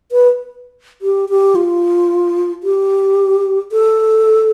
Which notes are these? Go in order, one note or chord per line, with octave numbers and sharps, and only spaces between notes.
B4
G4
G4
F4
G4
A4